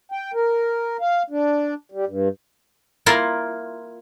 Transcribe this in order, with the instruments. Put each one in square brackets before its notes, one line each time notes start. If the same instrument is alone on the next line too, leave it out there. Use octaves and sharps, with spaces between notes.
[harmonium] G5
A#4
F5
D4
G3
G2
[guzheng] A#3 E4 F4 A#4 C6